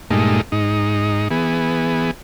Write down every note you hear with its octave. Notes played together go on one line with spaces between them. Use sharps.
G2 A#2 G#3 A3 D#4
G#2 D#4
E3 B3 G#4